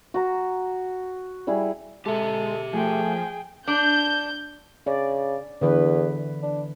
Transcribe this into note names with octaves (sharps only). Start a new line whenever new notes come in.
F#4 A#5
G3 E4 G#4
G#3 G4 A4 E5
F3 A3 G#4 G5
D4 G6
C#3 D5
E2 D3 E3 B4
D4